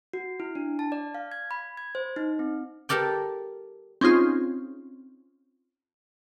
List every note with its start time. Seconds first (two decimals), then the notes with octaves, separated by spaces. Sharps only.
0.13 F#4
0.40 E4
0.55 D4
0.79 A5
0.92 D5
1.15 F5
1.32 G#6
1.51 B5
1.77 G#6
1.95 C5
2.16 D#4
2.39 C4
2.89 G4 A4 A#4 D5 G5
4.01 C4 C#4 D#4 F4 G#4